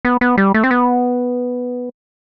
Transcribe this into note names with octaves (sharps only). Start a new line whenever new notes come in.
B3
B3
G3
A3
C4
B3